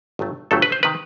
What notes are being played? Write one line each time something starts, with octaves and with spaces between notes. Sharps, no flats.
G1 G2 F#3 A3
G1 G2 F#3 A3 A4
B4
C5
C3 D#3 B4